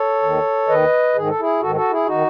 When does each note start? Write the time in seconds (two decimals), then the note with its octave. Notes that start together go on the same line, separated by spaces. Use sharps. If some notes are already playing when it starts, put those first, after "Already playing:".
Already playing: A4 C#5
0.23 D#2 D#3
0.68 D#2 D#3 B4 D#5
1.15 G#2 D#3 G#4
1.28 A4
1.40 E4 G#4
1.61 G#2 D#3 F#4 A4
1.75 F#4 A4
1.90 E4 G#4
2.06 D#3 D#4 F#4